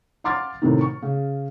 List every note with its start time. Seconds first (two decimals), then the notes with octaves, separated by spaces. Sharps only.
0.24 F5 F#5 C6 D6 F6 A6
0.62 A2 C3 D#3
0.81 C#6
1.02 C#3